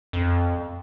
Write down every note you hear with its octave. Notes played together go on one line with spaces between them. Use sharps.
F2